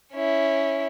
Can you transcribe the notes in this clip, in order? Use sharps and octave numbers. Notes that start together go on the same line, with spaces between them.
C#4 E4